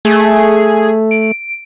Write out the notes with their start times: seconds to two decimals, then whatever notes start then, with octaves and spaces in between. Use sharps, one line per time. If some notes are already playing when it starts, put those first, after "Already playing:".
0.05 A3 G#4
1.11 D7